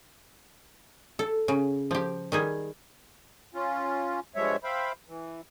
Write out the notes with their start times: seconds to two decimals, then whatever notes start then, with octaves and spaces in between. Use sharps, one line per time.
1.19 A4
1.48 C#3
1.91 F3 G4
2.32 D#3 G3 G#4
3.54 C#4 F4
4.35 G2 F3 G3 G#3 C#5 E5
4.64 C5 E5 F5 G5 B5
5.08 E3